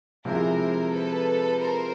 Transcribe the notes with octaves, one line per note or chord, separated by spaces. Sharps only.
C3 F3 G#3 C4 E4 A#4 C5
A4 B4
A#4 C5